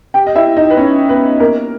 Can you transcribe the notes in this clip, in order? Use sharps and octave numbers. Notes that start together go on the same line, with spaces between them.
G4 G5
D#5
E4 E5
D#4 D#5
B4
C#4 C#5
B3 B4
A#3 A#4